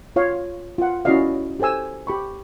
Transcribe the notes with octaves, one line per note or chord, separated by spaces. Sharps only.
F4 C#5 F5
F4 F#5
C#4 E4 F#4 D5 D#5 F5
G4 A4 C5 G#5 E6
G4 B5 C#6